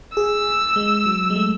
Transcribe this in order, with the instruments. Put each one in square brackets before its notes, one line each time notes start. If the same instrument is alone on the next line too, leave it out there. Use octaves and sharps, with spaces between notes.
[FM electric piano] G#4 [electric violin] E6
[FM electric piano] G#3
F#3
G#3
A3